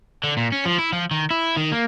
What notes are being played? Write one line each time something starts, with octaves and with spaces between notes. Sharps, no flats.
D3
A#2
C#4
F3
E4
F3
D#3
E4
D#3
A#3